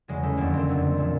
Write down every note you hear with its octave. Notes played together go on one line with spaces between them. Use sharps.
E2 C#3 F#3 G#3
A3
F2 D3 F#3 A#3
C4
F2 D3 F#3
A#2 F3